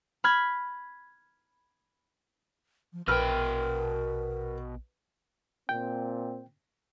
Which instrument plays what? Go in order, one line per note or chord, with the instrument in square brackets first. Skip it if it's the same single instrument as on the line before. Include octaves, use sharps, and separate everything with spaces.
[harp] B5 F6 G#6
[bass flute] F3
[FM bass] A#1 [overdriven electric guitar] B2 G5 [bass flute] A#4 [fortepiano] B4 F6
[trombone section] A#2 C4 [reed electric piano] G5